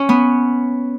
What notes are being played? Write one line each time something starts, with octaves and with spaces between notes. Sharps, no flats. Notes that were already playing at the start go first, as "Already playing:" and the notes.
Already playing: C#4
B3